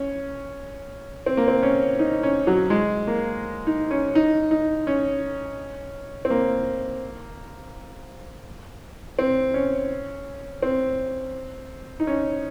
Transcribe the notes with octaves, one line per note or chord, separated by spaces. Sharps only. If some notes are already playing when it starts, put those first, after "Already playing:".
Already playing: C#4
C4
A#3
C4
C#4
D#4
C#4
F#3
G#3
A#3
D#4
C#4
D#4
D#4
C#4
C4
A#3
C4
C#4
C4
D#4
C#4